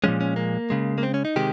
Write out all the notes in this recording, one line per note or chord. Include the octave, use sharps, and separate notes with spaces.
A#2 F3 G#3 C#4
C#4
A#3
C#3 G#3
A#3
C4
C#4
D#4
C3 D#3 G#3 G4